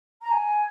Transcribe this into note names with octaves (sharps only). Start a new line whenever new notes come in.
A#5
G#5